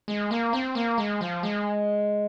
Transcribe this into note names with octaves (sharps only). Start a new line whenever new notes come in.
G#3
A#3
C4
A#3
G#3
F3
G#3